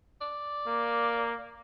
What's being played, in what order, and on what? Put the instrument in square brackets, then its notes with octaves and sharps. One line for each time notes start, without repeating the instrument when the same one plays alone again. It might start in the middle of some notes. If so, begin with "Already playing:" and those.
[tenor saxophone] D5
[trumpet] A#3